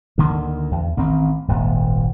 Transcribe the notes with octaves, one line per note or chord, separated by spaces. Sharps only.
D2 D3 D#3 A#3
E2
A1 D#3 C4
D#1 G#1 A#2